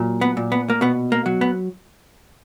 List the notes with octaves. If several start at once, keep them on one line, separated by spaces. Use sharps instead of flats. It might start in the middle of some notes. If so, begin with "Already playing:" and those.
Already playing: A#2 F#3
B3
A#2
B3
A#3
B2 B3
A#3
F#3
B3